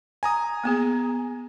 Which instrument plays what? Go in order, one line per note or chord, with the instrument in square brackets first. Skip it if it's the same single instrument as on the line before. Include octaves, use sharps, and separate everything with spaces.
[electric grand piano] G#5 A#5 D#6
[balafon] A#3 B3 G#4